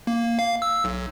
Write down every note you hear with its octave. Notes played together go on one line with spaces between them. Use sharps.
A#3
F5
E6
B1